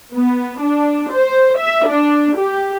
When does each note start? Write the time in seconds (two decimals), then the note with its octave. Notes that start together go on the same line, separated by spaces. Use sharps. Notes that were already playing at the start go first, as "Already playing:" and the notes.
0.14 B3
0.62 D4
1.12 C5
1.59 E5
1.88 D4
2.38 G4